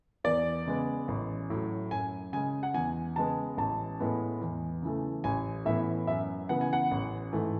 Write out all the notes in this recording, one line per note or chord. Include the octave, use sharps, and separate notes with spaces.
E2 D5
C#3 G#3 B3
A1
A2 F#3
F#2 G#5
C#3 G#3 G#5
F#5
E2 G#5
C#3 G#3 B3 A5
A1 A5
A2 G#3 B3
E2
C#3 E3 A3
A1 G#5
A2 E3 B3 E5
F#2 E5
C#3 E3 B3 F#5
G#5
F#5
A1
G#2 E3 A3